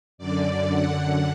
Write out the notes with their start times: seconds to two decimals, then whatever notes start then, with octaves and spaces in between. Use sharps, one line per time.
0.18 F#2 D3 D5
0.71 F#2 D3 F#5